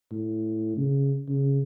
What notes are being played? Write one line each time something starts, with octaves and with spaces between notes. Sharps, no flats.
A2
C#3
C#3